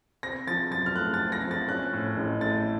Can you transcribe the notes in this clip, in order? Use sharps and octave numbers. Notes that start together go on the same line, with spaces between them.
C4 A#6
F3 A6
F#2 A6
F6
A3 F#6
A6
C4
A#6
F3
A6
C#4 F#6
A2
A1
A3 A6